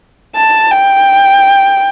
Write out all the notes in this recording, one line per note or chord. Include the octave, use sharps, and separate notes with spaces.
A5
G5